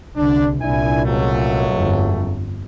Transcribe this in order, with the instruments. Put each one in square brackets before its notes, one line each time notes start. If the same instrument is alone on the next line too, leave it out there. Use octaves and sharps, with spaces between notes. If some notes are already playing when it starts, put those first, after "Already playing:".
[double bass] C2 D3 [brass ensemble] D4
[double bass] C2 A#2 [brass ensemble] D4 E4 G#5
[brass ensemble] C#2 F#3 A3
[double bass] G1 F2
G1